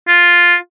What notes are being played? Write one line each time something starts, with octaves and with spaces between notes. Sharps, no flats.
F4